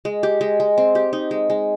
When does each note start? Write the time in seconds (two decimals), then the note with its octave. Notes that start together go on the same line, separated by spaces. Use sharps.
0.05 G#3
0.23 G4
0.41 G#3
0.60 G#3
0.78 C4
0.95 G4
1.13 D#4
1.31 G#3
1.50 G#3